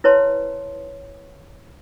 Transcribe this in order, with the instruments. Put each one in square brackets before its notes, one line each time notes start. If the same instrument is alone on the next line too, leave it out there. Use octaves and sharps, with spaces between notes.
[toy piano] E4 B4 C#5 A5 C6